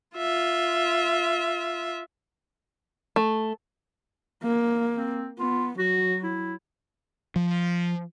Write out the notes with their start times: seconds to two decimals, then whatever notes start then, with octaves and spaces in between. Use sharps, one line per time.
0.17 F4 E5
3.16 A3
4.43 A#3
4.97 C4
5.39 B3 F4
5.79 F#3 F#4
6.23 E4
7.36 F3